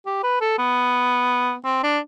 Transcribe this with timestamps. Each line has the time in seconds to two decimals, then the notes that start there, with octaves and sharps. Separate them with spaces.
0.06 G4
0.23 B4
0.41 A4
0.59 B3
1.65 C4
1.83 D4